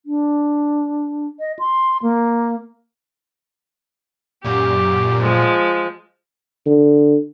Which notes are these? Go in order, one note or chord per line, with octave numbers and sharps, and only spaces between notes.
D4
D#5
C6
A#3
F#2 A#2 G4
F3 G#3
D3